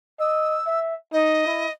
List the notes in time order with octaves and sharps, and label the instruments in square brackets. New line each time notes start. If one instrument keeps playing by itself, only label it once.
[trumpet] D#5 [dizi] E6
[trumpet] E5
[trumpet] D#4 [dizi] D#5
[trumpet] E4